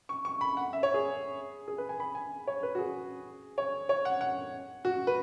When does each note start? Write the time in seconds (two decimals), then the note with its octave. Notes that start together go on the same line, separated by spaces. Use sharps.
0.09 C#6
0.25 C#6
0.41 B5
0.57 F#5
0.73 E5
0.83 C#5
0.94 G#4
1.68 G#4
1.78 B4
1.89 G#5
2.00 B5
2.15 G#5
2.47 C#5
2.63 B4
2.75 F#4
2.78 G#4
3.58 C#5
3.89 C#5
4.05 F#5
4.21 F#5
4.85 F#4
5.07 B4